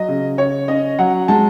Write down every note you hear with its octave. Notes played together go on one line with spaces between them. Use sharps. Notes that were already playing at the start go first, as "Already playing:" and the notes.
Already playing: F#3 D#5
C#3
C#3 C#5
C#4 D#5
F#3 F#5
G#3 A5